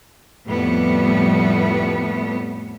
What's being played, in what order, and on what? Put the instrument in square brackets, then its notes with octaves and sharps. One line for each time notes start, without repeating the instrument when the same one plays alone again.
[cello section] F2 A2 G3 A3 B3